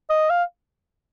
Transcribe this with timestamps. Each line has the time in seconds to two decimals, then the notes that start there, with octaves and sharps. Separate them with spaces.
0.10 D#5
0.30 F5